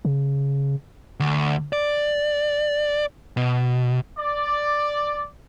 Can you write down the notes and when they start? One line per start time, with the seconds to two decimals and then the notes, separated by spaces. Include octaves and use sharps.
0.05 C#3
1.20 D2
1.73 D5
3.37 B2
4.19 D5